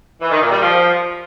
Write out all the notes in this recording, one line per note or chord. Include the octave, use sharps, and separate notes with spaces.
E3
D#3
A#2
G3
F3